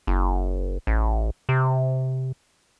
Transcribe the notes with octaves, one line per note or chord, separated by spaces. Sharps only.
F#1
A1
C3